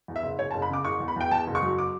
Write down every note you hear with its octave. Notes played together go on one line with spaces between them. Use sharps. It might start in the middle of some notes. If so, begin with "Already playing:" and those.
E2
E5
F#1
F#1 C#5
A5
F#1
B5
C#3 D6
F#1 C#6
E2
B5
E2 G5
E2 A5
F#1
C#6
F#3
D6